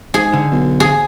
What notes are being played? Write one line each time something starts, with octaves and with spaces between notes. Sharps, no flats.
G#2 G#4
D3
B1
G#4